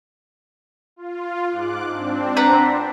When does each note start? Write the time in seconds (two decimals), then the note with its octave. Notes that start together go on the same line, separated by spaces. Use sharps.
0.96 F4
1.49 G#2 D6 F#6
1.88 C4 D4
2.37 B4 F#5 A#5